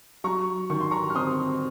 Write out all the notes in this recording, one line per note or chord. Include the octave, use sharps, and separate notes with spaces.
F#3 A#5 C#6
D#3 C#6
C6
A#5 C#6
F6
C4 C6 D#6